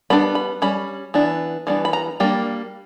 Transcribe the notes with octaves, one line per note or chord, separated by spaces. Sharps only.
G3 B3 D4 B5
B5
G3 C#4 B5
E3 B3 D4
E3 G3 B3 D4
B5
A#5
G3 A#3 D4 G5